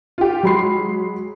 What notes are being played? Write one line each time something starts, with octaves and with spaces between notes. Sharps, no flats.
F4 G4
F#3 G#3 B5 C6 C7